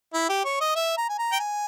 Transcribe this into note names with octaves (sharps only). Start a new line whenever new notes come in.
E4
G4
C#5
D#5
E5
A#5
G#5
A#5
G5
G#5